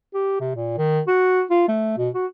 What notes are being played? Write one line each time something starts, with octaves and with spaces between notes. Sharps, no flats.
G4
C3
A#2
D#3
F#4
F4
A3
B2
F#4